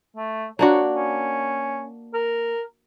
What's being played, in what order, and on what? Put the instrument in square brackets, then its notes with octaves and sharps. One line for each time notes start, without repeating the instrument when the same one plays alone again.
[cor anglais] A3
[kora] A#3 D4 F#4 [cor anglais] C#5
[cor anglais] C#4
A#4